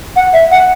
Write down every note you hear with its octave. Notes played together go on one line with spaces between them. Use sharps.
F#5
E5
F#5